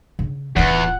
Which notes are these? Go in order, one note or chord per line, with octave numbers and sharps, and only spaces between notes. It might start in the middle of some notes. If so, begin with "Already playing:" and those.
C#3
D1 E2 F4 F#5